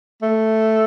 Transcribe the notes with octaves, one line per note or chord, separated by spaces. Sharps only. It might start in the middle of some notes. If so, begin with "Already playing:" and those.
A3